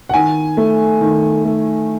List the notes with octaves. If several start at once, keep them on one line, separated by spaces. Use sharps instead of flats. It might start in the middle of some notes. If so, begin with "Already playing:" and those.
F#5
D#3 G#5
A3
D#3
A3